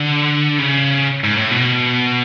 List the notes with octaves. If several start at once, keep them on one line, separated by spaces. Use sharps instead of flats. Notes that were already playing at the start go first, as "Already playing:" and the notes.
Already playing: D3
C#3
G#2
A2
B2